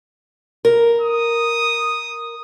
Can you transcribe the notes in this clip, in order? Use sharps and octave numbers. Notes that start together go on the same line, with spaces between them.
A#4
D#6